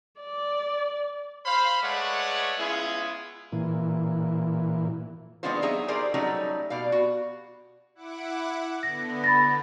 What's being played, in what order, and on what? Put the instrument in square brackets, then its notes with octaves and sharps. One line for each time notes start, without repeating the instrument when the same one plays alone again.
[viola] D5
[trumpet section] C5 F5 B5
G#3 A3 B4 C#5 D5 F#5
G#3 B3 C#4 E4 F4 G#4
[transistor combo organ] A#2 E3
[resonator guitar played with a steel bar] D#3 G#3 B3 D4 F4 C5
F#3 D#4 G#4 E5
G4 G#4 A#4 C5 D5
F#3 G3 A3 C#4 D#4
B2 D5 F5
F#4
[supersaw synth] E4 F#5 D6
[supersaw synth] D3 B3 [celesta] A#6
[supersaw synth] D3 [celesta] B5 A6 A#6